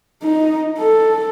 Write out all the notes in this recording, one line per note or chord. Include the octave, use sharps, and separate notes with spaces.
D#4
A4